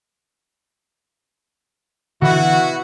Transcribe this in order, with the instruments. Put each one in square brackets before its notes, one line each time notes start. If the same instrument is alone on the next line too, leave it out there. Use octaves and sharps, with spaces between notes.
[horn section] B2 E4 F#4 [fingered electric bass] D3 E3